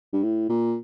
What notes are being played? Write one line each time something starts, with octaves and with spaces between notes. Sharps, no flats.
G2
A2
A#2